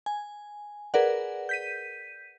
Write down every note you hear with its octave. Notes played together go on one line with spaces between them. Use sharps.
G#5
G#4 A#4 B4 D5 F#5
G6 B6 D#7